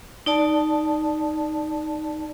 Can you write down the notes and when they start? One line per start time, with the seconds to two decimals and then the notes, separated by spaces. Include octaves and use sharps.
0.26 D#4 D5 A5